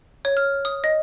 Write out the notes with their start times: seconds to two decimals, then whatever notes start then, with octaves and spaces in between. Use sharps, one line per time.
0.25 C#5
0.37 F6
0.65 D#6
0.84 D#5